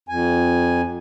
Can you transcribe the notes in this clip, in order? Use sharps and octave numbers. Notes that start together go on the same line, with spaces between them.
F2 G#5